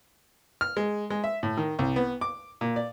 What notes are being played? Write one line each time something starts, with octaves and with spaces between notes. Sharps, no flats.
F6
G#3
G#3
E5
A2
D#3
C2
B3
D6
A#2
D5